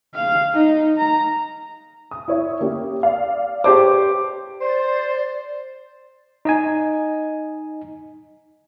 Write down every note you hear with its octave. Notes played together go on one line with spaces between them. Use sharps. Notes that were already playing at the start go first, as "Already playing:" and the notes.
F5
D#4
A#5
D#6
E4 C#5 E5
A#3 C#4 G4
D5 F5
G4 C5 C#5 A5 C6 D6
B4
C5 D5
D#4 D#5 G#5